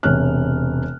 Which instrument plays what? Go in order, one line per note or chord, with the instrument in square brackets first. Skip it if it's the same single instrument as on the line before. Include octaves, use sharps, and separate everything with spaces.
[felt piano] E1 C3 C#5 F6 F#6